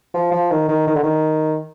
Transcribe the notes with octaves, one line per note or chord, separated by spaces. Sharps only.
F3
F3
D#3
D#3
D#3
D3
D#3